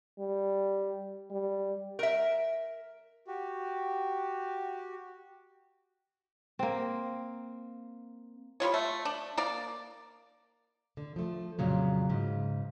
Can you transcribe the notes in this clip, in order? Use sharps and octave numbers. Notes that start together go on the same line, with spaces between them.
G3
G3
A#4 E5
F#4 G4
A#3 C4
G3 B3 F4 C#5
A3
D4
A#3 A#4 D5
D3
F3 A3
F2 A#2 C#3 F#3
G#2 C#3